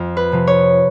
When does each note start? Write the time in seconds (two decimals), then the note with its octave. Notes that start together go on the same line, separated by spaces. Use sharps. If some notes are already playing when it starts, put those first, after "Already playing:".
Already playing: F2
0.17 B4
0.32 C3 F3
0.47 C#5